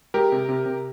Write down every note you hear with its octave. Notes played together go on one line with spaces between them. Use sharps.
G#3 G4 A#4
C3
C3
C3